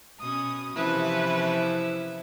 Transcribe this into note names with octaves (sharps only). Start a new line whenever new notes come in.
B2 C#4 D#6
C3 E3 F3 C#4 E4 B4